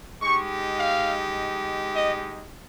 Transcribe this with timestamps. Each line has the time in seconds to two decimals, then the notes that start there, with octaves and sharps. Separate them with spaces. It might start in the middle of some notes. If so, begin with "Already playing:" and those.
0.21 G#3 D#4 G4 C#6
0.79 F5
1.96 D#5